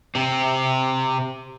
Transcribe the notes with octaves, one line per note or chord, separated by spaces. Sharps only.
C3 C4